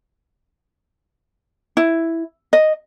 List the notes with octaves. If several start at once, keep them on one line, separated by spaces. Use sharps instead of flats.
E4
D#5